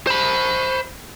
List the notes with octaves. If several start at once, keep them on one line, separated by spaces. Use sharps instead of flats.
C5 B5